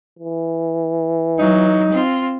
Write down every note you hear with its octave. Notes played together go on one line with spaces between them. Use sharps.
E3
F#3 D#4
C4 F4